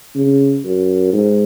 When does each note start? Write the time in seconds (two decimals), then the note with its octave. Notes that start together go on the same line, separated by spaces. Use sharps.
0.16 C#3
0.65 F#2
1.13 G#2